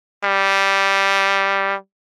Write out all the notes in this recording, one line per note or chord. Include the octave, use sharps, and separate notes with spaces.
G3